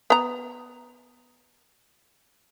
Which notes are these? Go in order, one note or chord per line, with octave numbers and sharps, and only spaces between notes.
B3 A#5